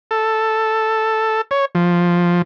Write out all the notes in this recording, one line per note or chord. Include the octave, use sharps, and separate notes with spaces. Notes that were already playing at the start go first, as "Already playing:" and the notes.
A4
C#5
F3